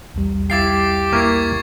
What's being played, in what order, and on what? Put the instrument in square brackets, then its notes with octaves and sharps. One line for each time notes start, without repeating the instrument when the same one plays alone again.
[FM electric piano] B1 E2 G3
[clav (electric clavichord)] E4 F5 G5 [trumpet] G4 [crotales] D6 A6 C7
[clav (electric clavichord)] A#3 E4 A#4 [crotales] C#6 G#6